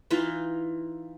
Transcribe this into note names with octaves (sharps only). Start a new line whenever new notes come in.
E3 D#4 F4